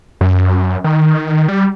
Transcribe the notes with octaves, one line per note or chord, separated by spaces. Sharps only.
F#2
D#3
G3